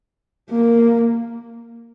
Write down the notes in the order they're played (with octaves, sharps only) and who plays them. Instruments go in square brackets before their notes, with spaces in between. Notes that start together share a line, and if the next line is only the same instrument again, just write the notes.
[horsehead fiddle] A#3